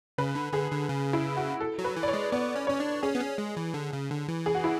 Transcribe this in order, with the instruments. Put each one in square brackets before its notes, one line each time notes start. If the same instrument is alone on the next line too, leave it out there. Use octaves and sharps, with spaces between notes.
[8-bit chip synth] C#3 [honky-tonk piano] B4
[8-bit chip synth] D3
[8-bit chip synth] D3 [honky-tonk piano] G#4
[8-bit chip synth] D3
C#3
[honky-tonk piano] E4
F#4
A4
[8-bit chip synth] F#3
[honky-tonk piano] B4
[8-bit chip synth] E3
[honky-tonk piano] D5
C#5
[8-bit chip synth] G#3
[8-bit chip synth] B3 [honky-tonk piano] D5
[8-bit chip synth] C#4
[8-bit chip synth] C#4 [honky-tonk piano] C#5
[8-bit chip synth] D4
[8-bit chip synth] C#4 [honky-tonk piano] G#4
[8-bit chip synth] B3
C#4
G#3
E3
D3
C#3
D3
E3
[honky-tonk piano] G#4
F#4
E4